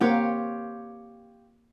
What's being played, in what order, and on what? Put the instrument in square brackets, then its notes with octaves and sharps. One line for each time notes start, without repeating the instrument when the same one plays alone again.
[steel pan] A#3 C4 F#5 [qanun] F4 G4 C#5